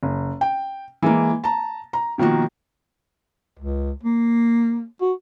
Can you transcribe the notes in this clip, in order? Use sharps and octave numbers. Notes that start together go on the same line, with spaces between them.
F#1
G5
E3 G#3 A#3
A5 A#5
A#5
B2 D#3 F3 A#3 F#4
C#2
A#3
F#4